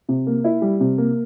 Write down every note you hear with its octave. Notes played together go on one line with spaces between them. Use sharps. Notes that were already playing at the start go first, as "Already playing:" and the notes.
C3
A#3
E4
G3
C3
A#3